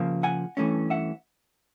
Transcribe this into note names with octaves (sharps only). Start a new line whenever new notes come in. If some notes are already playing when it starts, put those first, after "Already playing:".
Already playing: C#3 F3 A#3
F#5 G#5
G2 E3 A3 C#4
E5 F#5